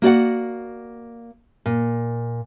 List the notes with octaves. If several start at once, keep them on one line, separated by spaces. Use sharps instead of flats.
A#3 F#4 D5 F#5
A#2